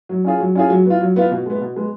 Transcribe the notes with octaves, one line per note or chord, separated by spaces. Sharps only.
F#3
C#4 F4 G#4
F#3
C#4 F4 G#4
F#3
B3 F4
F#3
B3 F4
B2
G#3 B3
B2
G#3 B3